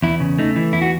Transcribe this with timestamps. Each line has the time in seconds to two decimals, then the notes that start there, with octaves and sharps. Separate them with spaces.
0.03 E2 E4
0.20 C#3
0.38 A3 D#4
0.56 E3
0.73 E2 E4
0.82 F#4